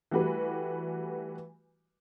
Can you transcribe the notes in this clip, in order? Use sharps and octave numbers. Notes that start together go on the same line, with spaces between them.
E3 G3 A3 F#4 G4 B4